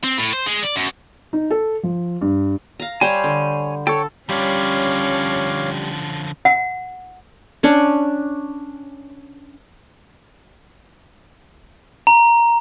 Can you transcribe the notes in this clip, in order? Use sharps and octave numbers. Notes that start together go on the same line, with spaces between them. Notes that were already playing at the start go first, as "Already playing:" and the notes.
C4
A2
C5
G#3
D5
F#2
D#4
A4
F3
G2
F5 A#5
G3 C5 C#5 G#5
D3
A4 C#5 G5
D3 F3 G3 C#4 C#5 F5 D6
F#5
C#4 D4 C#5
A#5